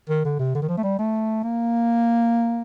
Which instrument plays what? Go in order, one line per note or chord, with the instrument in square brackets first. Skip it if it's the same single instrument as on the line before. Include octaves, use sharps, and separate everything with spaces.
[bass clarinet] D#3
D3
C3
D3
D#3
F3
A3
G3
A3
A#3